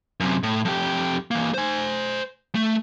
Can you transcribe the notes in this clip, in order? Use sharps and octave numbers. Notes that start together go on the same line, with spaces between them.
F#2 C3
A2
F2 G4
E3 A#3
C5 G#5
A3